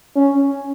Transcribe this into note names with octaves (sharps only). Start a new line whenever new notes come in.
C#4